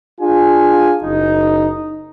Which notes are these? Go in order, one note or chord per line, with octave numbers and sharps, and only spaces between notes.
D4 F4 G#4 F5 G#5
F#1 D#4